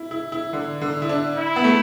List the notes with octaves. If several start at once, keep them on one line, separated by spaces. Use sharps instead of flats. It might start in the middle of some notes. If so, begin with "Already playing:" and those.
Already playing: E4
E4
E4
D3
D3
E4
D4
E4
B3
A3